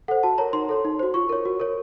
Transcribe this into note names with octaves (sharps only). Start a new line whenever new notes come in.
A4 C5 F#5
F#4 A5
A#4 C#5 A#5
D#4 C6
A4 C#5
D#4
F#4 C5
F4 C#6
A#4 C#5
F#4
A#4 C#5